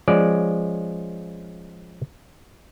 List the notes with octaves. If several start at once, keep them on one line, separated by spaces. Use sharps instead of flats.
F3 G#3 C#4 D5